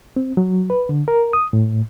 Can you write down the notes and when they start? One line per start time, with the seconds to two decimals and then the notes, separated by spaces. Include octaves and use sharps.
0.16 C4
0.37 F#3
0.70 B4
0.89 D3
1.08 A#4
1.33 D#6
1.53 A2